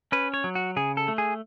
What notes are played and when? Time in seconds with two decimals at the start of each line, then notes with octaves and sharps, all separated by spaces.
0.12 C#4 B4
0.34 C#5
0.44 F#3
0.55 F#4
0.76 C#3 G#4
0.97 A4
1.08 A3
1.18 G#4